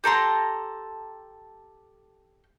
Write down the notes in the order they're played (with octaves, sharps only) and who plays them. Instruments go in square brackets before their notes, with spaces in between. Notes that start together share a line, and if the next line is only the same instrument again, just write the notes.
[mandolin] G4 A4 A#5 C6